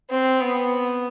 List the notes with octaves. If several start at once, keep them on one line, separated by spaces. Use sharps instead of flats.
C4
B3